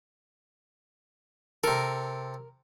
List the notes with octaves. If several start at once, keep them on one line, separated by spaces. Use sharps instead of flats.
C3 A4 A#4